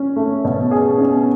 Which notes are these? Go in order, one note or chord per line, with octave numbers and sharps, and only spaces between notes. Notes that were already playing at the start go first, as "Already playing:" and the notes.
Already playing: C#4
A3
B2
G#4
C#4